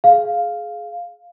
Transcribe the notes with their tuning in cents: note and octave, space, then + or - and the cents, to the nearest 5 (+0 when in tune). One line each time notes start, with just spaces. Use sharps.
G#4 +20 F5 +0